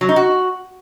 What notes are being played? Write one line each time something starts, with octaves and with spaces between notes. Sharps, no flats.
F#3
D#4
F#4